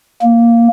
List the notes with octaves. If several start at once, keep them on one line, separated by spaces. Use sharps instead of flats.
A#3